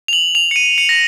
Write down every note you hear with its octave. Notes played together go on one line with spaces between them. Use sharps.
F7
F#7
F7
C#7
D#7
C#7
A#6